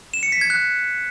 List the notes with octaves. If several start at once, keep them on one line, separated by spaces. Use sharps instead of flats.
E7
C#7
B6
G#6
F#6